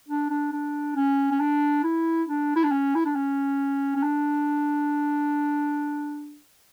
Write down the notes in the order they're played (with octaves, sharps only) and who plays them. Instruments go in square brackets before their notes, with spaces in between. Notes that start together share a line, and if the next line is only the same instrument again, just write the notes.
[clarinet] D4
D4
D4
C#4
C#4
D4
E4
D4
E4
D4
C#4
E4
D4
C#4
C#4
D4